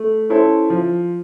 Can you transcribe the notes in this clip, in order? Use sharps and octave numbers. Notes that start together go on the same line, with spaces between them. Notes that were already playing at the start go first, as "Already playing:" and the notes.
Already playing: A3
C#4 E4 A4 C5
F3